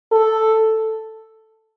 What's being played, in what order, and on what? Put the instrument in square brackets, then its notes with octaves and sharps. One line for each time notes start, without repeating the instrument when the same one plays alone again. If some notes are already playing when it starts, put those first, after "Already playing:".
[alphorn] A4